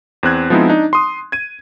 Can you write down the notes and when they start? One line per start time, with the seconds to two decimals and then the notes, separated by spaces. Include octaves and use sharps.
0.23 E2 C4 F#6 G#6
0.50 F3 G#3 B3 C4 D#4 E4
0.69 D4 D#4
0.93 C6 D#6
1.32 G#6 D#7